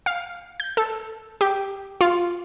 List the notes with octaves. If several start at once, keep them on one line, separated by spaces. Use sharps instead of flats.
F5
G6
A4
G4
F4